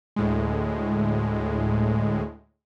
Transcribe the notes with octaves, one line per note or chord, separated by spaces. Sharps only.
D2 A2 G#3